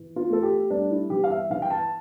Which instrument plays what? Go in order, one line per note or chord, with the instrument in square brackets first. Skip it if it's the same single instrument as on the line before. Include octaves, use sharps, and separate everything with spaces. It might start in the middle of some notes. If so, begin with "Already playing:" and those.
Already playing: [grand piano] E3
F4
A3 A4
G4
G3 D4
E4
E3 G4
F5
E5
E3 F5
G5
A5